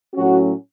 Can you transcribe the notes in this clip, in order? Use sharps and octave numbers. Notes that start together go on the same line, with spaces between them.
A2 F#3 C#4 F#4